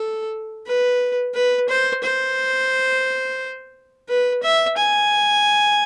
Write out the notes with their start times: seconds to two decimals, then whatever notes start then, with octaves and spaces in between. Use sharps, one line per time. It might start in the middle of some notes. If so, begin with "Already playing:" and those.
Already playing: A4
0.67 B4
1.35 B4
1.69 C5
2.04 C5
4.09 B4
4.43 E5
4.77 G#5